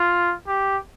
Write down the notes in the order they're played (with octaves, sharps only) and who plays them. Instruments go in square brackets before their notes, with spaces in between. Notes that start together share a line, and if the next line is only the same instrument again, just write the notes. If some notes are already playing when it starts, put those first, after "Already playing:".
Already playing: [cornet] F4
G4